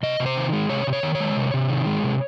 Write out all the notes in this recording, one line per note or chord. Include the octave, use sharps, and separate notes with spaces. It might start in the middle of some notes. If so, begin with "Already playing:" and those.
C3 D#5
C3
C5
D#3
G#3
C3 C#5
C3
C#5
D#3
C#5
G#3
C3
C3
D#3
G#3
C3